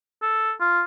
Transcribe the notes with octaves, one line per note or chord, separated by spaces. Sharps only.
A4
F4